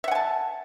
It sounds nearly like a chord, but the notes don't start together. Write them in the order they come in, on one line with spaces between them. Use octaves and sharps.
E5 F#5 G#5 A5